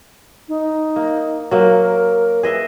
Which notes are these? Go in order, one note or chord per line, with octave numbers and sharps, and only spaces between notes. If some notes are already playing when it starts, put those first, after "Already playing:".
D#4
A#3
F#3 A#3 A#4
G#4 B4 D#5 E5